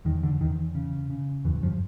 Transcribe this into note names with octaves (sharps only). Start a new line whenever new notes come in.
E2 D#3
D3
E2 D#3
C#3
C#3
E2 G2 E3
F2 F3